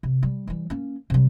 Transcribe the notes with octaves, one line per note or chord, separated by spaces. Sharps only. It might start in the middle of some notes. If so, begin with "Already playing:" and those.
C3
G3
E3 G3
A#3 C#4
C3 G3